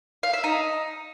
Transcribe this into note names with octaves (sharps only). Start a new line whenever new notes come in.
F5
E5
D#4